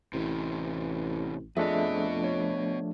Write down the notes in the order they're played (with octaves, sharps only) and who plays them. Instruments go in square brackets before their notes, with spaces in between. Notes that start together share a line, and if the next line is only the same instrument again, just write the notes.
[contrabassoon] A1 [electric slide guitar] C3 E3
[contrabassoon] F2 [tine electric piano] F3 A3 D4 [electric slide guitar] B3 D#5 [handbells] G#4 E5
[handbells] C#5